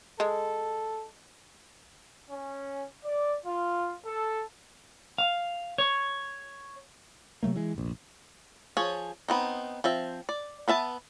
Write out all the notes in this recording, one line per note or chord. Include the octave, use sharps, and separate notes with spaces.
G#3 A4
C#4
D5
F4
A4
F5
C#5
C3 F#3 A3 A#3
E3 G#3
F1 A#1
F3 G#4 C#5
B3 C4 D#4
F3 C4 E5
D5
B3 B4 E5 A5